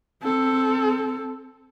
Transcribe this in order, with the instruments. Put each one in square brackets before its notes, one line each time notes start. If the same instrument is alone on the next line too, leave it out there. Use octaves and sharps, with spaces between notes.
[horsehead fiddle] C4 A4